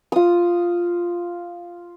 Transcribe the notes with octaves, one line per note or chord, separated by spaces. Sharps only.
F4 D#6